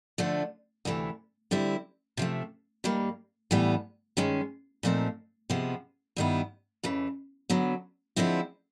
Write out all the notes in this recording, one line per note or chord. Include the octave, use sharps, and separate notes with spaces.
D3 F3 A3 D4
D2 C3 E3 A3
D3 G3 C4 E4
C3 F3 A3
G2 D#3 G3 A#3
A2 E3 G3 B3
G2 D#3 G#3 C#4
A#2 F3 A3 C4 D#4
C3 F3 G#3 B3
G2 D#3 G3 B3 E4
F2 C#3 E3
D3 F#3 B3
D3 F3 G#3 C4 E4